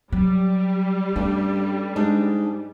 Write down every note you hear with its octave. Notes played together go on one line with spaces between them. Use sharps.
F#3 G3
G2 A3 C#4
G#2 G#3 D4 D#4